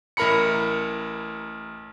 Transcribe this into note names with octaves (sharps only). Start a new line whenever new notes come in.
A1 E4 A#4 A#5 B5 C#7